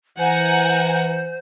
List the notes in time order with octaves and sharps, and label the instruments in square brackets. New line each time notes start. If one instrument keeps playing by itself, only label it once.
[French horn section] E3 [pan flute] C5 [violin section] F#5 G#5 A#5